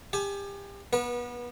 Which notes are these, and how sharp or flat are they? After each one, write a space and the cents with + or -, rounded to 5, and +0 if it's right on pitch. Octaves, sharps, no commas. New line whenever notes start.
G4 +30 G#5 +35
B3 -25 B4 -40